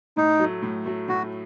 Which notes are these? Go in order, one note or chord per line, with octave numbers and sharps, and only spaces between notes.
A2 D#4
F#3 A3
A2
F#3 A3
A2 F#4